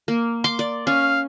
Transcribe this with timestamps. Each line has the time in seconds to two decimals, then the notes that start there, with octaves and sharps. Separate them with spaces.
0.08 A#3
0.44 C6 D6
0.59 D5
0.87 C#4 F5